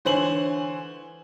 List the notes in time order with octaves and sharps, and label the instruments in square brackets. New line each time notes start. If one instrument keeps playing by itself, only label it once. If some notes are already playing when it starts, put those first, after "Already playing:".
[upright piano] D3 E3 C5 C#5 G#5 F#7